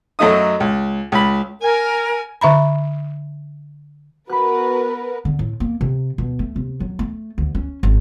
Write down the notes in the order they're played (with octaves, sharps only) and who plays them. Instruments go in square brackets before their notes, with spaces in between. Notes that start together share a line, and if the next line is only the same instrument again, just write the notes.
[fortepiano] F#2 F#3 A3 D#4 D#6
C#2
C#2 B5
[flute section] A#4 [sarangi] G#5
[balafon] D3 E5 A#5 B5
[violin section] B3 A#4 B4 [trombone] F#4 [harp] B5 F#6
[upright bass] D3
A2
A#3
C3
B2
A3
C3
F#3
A3
D2
C#4
G#1